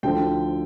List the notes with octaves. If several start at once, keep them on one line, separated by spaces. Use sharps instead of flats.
D2 D3 F3 G5